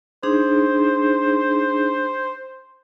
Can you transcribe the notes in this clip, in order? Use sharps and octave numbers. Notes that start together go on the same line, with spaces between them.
D4 D#4 G#4 C5